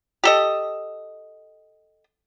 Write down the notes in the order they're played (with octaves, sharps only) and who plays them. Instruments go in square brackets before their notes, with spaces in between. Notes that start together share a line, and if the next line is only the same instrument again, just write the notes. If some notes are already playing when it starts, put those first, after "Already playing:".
[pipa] G4 A4 D#5